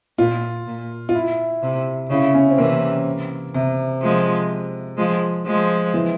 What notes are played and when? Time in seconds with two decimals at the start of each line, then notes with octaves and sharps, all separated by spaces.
0.18 A#2 F4
0.67 A#2
1.09 F4
1.15 E4
1.62 C3
2.10 C#3 E4
2.34 C#4
2.51 C4
2.58 C3 E3 A#3
3.54 C3
4.02 F3 G#3
4.97 F3 G#3
5.46 F3 G#3
5.94 E3